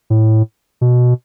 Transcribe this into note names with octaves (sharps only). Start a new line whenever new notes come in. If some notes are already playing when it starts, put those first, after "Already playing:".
A2
B2